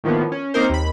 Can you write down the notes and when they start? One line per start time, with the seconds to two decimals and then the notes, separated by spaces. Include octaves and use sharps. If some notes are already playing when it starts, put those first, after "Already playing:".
0.04 A2 D#3 F3 A#3 B3
0.32 C#4
0.54 A#3 C4 D#4 A#4 C5
0.70 D#2 B5